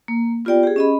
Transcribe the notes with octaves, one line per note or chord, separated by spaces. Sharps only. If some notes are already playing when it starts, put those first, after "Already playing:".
A#3
B3 F4 G4 D5 G5
G4 G#4
C#4 D#5 B5